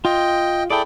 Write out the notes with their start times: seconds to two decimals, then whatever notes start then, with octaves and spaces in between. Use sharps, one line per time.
0.05 F4 D#5 G5
0.70 E4 G#4 A4 D5 G5